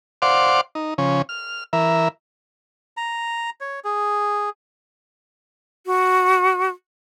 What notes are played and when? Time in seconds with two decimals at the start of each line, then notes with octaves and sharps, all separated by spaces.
0.22 C5 D5 F5 F#5 C6 D6
0.75 D#4
0.98 C#3 F3 C#4
1.29 F6
1.73 E3 A#4 E5
2.97 A#5
3.61 C#5
3.84 G#4
5.86 F#4